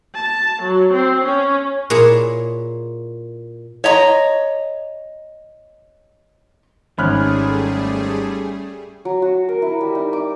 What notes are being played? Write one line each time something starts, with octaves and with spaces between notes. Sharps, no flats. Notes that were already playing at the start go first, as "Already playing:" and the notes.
A5
F#3
C4
C#4
A#2 E4 G#4 C#5
C#5 D#5 A#5
G#1 G3 A3 C#4 G#4 B5 F6 F#6
F#3
F#4
A#4
E4
G3
D#4
D6